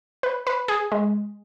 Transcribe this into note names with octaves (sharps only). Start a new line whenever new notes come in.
B4
B4
G#4
G#3